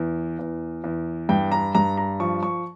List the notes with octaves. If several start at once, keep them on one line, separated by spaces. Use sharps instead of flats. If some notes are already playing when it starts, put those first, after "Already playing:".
Already playing: E2
E2
E2
G2 G5
A#5
G2 A#5
A#5
F3 C#6
C#6